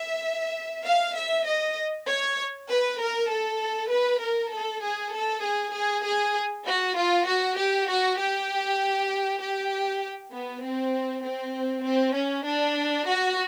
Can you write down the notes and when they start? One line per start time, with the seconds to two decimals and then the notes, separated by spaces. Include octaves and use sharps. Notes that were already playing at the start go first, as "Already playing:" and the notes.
Already playing: E5
0.86 F5
1.17 E5
1.47 D#5
2.09 C#5
2.70 B4
3.00 A#4
3.30 A4
3.92 B4
4.22 A#4
4.52 A4
4.83 G#4
5.14 A4
5.44 G#4
5.74 G#4
6.05 G#4
6.66 F#4
6.97 F4
7.27 F#4
7.58 G4
7.88 F#4
8.19 G4
9.41 G4
10.32 B3
10.63 C4
11.24 C4
11.85 C4
12.16 C#4
12.46 D4
13.07 F#4